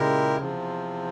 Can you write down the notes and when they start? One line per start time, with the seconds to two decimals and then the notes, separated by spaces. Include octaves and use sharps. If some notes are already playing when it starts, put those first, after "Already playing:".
Already playing: A#2 C#3 G#3 E4 G4 A#4
0.36 E2 C3 F3